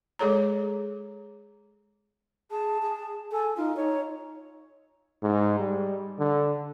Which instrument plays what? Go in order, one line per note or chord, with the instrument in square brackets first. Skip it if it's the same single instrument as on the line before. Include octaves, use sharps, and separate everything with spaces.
[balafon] G#3 G#4 A4 C#5 A#5
[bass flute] G#4 [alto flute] A5
[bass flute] G#4
[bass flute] A4 [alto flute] G#5
[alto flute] D#4 [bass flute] F4
[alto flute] D#4 [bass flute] C#5
[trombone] G#2
G3
D3